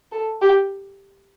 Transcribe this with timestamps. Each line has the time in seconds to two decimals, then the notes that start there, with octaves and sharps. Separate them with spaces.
0.12 A4
0.42 G4